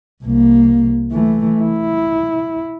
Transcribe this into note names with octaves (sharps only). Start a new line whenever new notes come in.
C2 A#3
E3 A3
E4